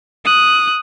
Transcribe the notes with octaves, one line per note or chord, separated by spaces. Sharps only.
D#6 F#6